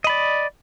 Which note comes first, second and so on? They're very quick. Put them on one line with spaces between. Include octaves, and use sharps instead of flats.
D#5 B5 D5